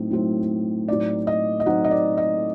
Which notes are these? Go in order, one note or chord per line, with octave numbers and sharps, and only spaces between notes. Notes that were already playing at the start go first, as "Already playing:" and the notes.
Already playing: A2 F#3 C4 D#4
A2 F#3 C4 D#4
A2 F#3 C4 D#4 D5
D#5
D#5
A2 F#3 C4 D#4 F#5
D#5
D5
D#5